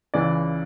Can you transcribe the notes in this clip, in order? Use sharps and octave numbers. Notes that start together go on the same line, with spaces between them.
C#2 C#3 E3 D5